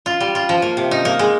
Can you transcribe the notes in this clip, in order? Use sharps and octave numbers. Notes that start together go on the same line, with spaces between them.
F4
G3
F4
F3
A#3
C3
D#4
A#3
G#3